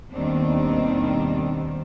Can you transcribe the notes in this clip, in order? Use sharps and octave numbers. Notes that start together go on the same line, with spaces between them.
D#2 B2 D#3 G3 C4 D4